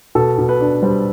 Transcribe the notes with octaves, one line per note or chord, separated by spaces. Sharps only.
B2 A4
B2
B4
D4
G3 C5